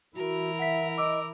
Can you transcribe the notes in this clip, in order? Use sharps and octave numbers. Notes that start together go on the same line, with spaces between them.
E3 E4 F#4 A#4
E5 F#5 B6
D#5 D6 E6 D7